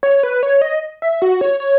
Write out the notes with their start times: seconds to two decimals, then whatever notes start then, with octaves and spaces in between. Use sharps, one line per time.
0.03 C#5
0.23 B4
0.43 C#5
0.62 D#5
1.02 E5
1.22 F#4
1.41 C#5
1.60 C#5